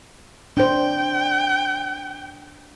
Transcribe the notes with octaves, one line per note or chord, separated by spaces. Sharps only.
D4 C5 G5